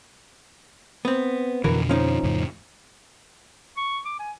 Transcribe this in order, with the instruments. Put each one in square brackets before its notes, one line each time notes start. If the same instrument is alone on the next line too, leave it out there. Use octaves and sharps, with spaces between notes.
[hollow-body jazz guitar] B3 C4
[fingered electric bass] F2 B2 D3 [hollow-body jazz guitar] E3 F#4 A#4
[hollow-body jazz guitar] F3 C#4 D#4
[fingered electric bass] F2 A2 C#3
[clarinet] C#6
D6
G#5